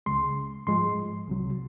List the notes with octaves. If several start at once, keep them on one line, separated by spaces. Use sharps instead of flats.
C#2 C#3 G#3 C6
G#2 F3 G#3 C6
C2 C3 F#3